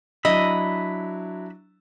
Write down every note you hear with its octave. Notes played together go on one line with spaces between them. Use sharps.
F#3 D4 E4 D#5 B5 E6